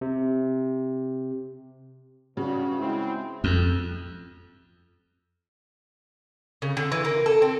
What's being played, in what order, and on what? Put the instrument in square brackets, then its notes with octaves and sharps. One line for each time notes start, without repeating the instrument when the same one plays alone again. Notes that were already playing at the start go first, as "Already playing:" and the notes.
[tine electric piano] C3
[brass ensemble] G2 [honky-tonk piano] C#3 [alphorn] F#4
[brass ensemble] G#3 C4 [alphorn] E4
[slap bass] F2
[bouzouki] C#3
D3
E3
A#3
A4
C4